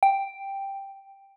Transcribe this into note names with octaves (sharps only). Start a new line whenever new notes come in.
G5